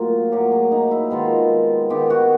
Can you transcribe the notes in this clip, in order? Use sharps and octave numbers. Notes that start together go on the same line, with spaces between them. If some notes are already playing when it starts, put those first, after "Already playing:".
Already playing: A2 F#3 A#3 F4
A2 F#3 A#3 G4
G#4
D#4
E4
D#3 G#3 B3 F4
D#3 G#3 B3 G4
F#4